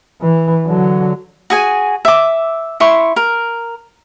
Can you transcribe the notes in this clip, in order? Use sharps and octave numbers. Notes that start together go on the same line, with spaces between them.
E3
D3 F#3
F#4 G#4 G#5
E5 D6
E4 C6 C#6
A#4